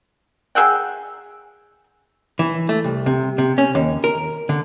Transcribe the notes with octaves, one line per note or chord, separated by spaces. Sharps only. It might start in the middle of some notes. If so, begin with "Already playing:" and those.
G#4 E5 F#5 G5
E3
A3
C2
C3
C3
C#4
D#2
A#4
D3